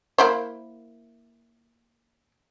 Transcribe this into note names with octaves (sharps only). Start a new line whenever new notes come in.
A#3 E4 C5